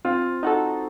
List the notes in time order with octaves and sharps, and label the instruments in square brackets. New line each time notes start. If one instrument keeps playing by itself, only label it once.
[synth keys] C4 [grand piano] F4
[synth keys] D#4 F#4 A4